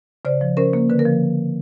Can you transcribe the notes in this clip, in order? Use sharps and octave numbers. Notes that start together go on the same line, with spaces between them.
C#3 C5 D5
F3
C#4 A#4 C5
A#3
D3 B4
A#4
F3